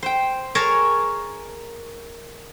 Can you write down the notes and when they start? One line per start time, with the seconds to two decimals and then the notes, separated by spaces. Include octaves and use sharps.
0.03 C5 G5
0.55 G#4 A#4 C#5 A5 A#5